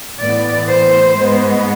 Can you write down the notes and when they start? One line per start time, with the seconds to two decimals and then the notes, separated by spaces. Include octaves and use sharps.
0.20 A2 E3 B3 D5
0.68 C5
1.16 G#2 G#3 B3